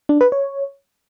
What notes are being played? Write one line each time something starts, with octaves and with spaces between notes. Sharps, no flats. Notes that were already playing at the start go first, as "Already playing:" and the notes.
D4
B4
C#5